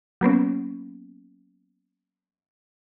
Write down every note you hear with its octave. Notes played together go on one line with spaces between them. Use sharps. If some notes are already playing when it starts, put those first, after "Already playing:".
F#3 A#3 B3 C#4